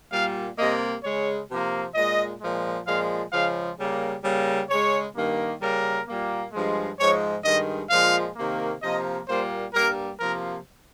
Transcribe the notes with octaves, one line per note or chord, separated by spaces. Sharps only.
A#2 G3 A#3 F5
C3 G3 A#3 D#5
C#3 G#3 C#5
C3 F3 A#3
A#2 G#3 D#5
A#2 F3 G#3
A#2 F3 G#3 F5
C#3 F3 G#3 F5
C#3 G3 A#3
C#3 G3 A#3
C#3 G#3 C#5
G2 D#3 A#3
C#3 G3 A#3 A#4
A#2 G3 A#3
G2 F3 G#3
G#2 F3 G#3 C#5
G2 D#3 G#3 D#5
A#2 F3 G#3 F5
C3 D#3 A#3
C3 F3 A#3 D#5
A#2 G3 A#3 C5
G2 G3 A#3 A#4
C3 F3 A#3 A#4